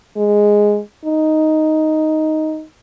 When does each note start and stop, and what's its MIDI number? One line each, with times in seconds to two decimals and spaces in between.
0.17 0.80 56
1.05 2.64 63